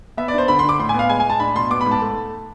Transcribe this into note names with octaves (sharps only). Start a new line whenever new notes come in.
B3 E5
D5
D4 C5
D3 B5
C6
D3
D6
A2 C6
G#5
B3 F5
G#3 G#5
G#5
A2 A5
D4 B5
B2 C6
B3 D6
B5
G#2
A5
A3